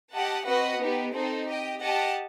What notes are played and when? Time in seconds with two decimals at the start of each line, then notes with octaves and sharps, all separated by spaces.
0.14 G4 D#5 F#5 A5
0.47 C4 F#4 B4 D#5 F#5
0.80 B3 D#4 G4
1.14 C4 D#4 A4 C5
1.47 G4 D#5 G5
1.80 G4 D#5 F#5 A5